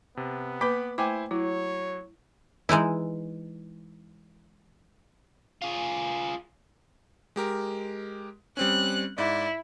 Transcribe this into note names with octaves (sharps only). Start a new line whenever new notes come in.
C3 B3
A#3 B4 B5 D6 B6
A3 E4 C5 G5 G#5 D6
F#3 E4 C#5
E3 G#3 D#4 E4
F4 G#4
G#3 G4 A#4
G3 C4 C#4 F#6
G#2 E4 D5